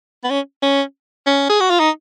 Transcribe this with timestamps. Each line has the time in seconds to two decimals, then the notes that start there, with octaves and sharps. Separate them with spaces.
0.24 B3
0.30 C#4
0.63 C#4
1.27 C#4
1.49 G#4
1.61 F#4
1.70 F4
1.80 D#4